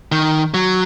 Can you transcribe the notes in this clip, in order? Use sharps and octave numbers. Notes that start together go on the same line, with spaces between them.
D#3
F#3